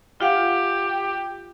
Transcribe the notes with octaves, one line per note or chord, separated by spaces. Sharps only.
F4 G4 F5 F#5